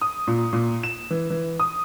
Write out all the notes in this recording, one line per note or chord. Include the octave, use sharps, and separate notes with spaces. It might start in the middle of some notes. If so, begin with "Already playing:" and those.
D#6
A#2
A#2
E7
E3
E3
D#6